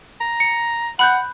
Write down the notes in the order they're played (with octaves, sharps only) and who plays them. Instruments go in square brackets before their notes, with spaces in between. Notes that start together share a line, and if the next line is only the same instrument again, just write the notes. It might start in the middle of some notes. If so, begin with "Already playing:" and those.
[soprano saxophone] A#5
[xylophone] C#7
[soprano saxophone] F#5 [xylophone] B5 F#6 G6